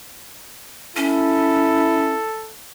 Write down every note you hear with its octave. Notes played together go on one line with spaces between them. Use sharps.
C#4 E4 A4